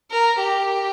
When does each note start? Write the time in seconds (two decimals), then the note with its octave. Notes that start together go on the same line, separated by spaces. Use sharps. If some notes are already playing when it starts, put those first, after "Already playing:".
0.11 A#4
0.39 G4